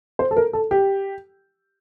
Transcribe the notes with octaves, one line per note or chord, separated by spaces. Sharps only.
C5
A4
A#4
A4
G4